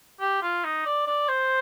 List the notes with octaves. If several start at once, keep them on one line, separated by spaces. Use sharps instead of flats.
G4
F4
D#4
D5
D5
C5